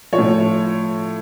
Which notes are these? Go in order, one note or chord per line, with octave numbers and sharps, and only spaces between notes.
F3 C#5
A2